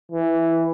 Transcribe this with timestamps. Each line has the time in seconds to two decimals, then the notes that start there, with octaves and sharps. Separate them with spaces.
0.12 E3